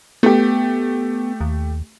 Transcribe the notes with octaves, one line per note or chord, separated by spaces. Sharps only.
A3 B3 G4
D#2